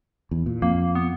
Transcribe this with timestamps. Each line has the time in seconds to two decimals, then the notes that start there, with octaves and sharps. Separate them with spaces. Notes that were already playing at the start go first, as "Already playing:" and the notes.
0.31 E2
0.46 A#2
0.62 F2 A#3
0.95 B3